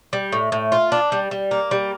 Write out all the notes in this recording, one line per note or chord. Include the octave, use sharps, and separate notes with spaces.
G3
A2
A2
F4
D4
G3
G3
A#3
G3